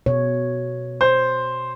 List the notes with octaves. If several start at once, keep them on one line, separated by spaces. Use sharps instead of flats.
B2 C#5
C5